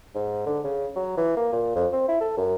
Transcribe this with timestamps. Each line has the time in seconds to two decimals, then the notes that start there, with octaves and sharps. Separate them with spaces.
0.15 G#2
0.46 D3
0.64 C#3
0.96 F#3
1.17 E3
1.37 A#3
1.53 A#2
1.76 F2
1.93 C4
2.08 E4
2.21 A4
2.37 F#2